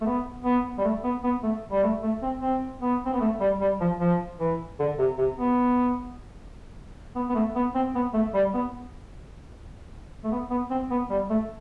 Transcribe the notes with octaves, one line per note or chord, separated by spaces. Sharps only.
A3
B3
B3
G3
A3
B3
B3
A3
G3
A3
A3
C4
C4
B3
C4
B3
A3
G3
G3
F3
F3
E3
D3
C3
C3
B3
B3
B3
A3
B3
C4
B3
A3
G3
B3
A3
B3
B3
C4
B3
G3
A3